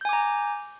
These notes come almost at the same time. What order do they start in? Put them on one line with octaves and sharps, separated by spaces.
G6 G#5 D6 A#5